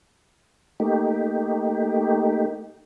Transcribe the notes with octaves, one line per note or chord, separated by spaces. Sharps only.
A3 A#3 D#4 G4